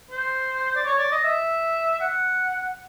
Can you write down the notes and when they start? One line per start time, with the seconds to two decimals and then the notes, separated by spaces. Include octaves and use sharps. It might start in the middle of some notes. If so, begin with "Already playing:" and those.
0.10 C5
0.75 D5
0.85 C#5
0.99 D5
1.12 D#5
1.24 E5
2.00 F#5